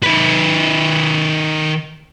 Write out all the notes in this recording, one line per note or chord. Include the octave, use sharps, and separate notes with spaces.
D#3 B4